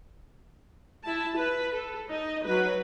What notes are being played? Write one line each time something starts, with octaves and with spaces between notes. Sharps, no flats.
E4 A5
B4
A4
D#4 D#5
F#3 B4